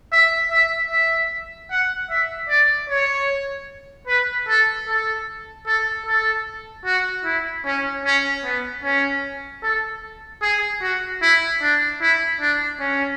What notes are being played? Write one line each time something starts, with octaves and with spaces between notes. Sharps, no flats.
E5
E5
E5
F#5
E5
D5
C#5
B4
A4
A4
A4
A4
F#4
E4
C#4
C#4
B3
C#4
A4
G#4
F#4
E4
D4
E4
D4
C#4